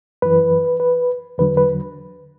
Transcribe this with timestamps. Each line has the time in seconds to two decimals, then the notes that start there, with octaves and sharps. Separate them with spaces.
0.22 F#2 E3 B4
0.80 B4
1.38 E2 D3 F#3 B4
1.57 B4